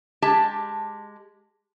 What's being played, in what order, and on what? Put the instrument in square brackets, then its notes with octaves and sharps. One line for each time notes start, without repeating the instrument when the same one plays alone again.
[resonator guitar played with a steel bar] G#3 G4 A5